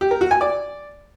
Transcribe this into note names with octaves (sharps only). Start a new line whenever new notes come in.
G4
A#4
F#4
G#5
D5